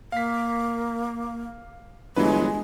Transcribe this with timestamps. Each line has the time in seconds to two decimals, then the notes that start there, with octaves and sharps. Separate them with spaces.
0.12 A#3 F5 B6
2.16 G1 E3 F#3 G#3 B4